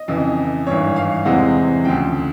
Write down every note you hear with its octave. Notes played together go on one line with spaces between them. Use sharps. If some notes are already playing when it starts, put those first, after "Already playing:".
Already playing: D#5
F2 C#3 E3
G#1 G2 E3 C#5
F5
E2 C3 E3 G#3 C4 F#5
D2 C#3 F3 G5